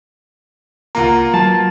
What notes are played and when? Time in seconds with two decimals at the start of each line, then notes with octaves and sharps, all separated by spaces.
0.95 C#2 A#3 F4 F#5 A#5
1.34 F#3 A5